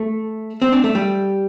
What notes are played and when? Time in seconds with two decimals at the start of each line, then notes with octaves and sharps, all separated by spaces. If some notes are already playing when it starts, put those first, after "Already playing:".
Already playing: A3
0.62 C4
0.72 D4
0.84 A3
0.95 G3